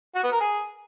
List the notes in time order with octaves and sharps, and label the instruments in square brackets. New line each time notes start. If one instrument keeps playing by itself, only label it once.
[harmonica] F#4
B3
A#4
G#4